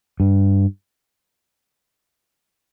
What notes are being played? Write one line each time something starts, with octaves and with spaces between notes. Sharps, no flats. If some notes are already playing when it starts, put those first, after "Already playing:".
G2